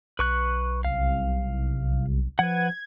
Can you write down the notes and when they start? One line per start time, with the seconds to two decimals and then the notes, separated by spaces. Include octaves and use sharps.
0.19 B1 B4 C#6 F#6
0.85 C2 F5
0.98 C2
2.39 F3 B4 F#5 G#6